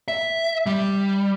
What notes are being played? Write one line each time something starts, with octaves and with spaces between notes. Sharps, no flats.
E5
G3